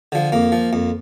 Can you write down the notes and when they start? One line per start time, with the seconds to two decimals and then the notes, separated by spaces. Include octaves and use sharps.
0.12 D3 F3
0.32 F2 A#3
0.52 F3
0.73 F2